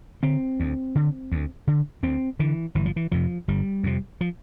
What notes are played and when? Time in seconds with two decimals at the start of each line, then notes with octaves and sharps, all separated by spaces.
0.23 D3 C4
0.60 D2
0.95 D3
1.32 D2
1.67 D3
2.03 D2 C4
2.39 D3 E3
2.75 G1 E3
2.86 F3
2.96 E3
3.12 F2 C3 F3
3.48 G1 G3
3.83 F2 C3
4.21 F3